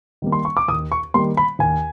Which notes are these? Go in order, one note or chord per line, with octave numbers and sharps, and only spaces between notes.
D#3 G3 A#3
C6
C#6
D6
D#2 D#6
C#6
D#3 G3 A#3 C6
B5
D#2 G#5